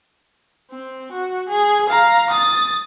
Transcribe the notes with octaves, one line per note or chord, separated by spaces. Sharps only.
C4
F#4
G#4
F5 A#5
D#6 A6